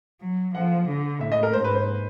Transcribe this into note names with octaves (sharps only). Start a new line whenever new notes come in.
F#3
F3 F#5
D3
A2 E5
D#5
A#4
G#2 C5
B4
C5